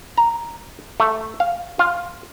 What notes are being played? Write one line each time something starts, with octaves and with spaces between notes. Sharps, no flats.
A#5
A3
F5
F4